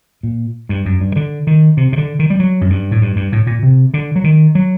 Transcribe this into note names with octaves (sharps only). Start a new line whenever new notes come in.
A#2
G2
F#2
G2
D3
D#3
C3
C3
D3
D#3
G3
F#3
F#2
G2
A2
G2
G2
A2
A#2
C3
D3
F#3
D#3
F#3